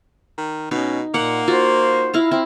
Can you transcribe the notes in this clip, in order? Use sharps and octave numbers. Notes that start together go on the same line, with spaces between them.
D#3
B2 C#4 D#4
A#2 A#3 F#5
F4 F#4 C5
E4 F5 A#5
C4 E4